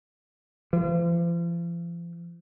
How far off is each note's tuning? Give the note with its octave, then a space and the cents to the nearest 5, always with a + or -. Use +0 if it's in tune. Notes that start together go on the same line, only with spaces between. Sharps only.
F3 -40